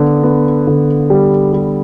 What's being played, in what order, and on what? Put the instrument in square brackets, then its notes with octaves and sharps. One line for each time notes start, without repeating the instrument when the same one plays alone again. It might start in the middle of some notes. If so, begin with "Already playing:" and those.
Already playing: [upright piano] D3 B3
B3
D3
G3
G3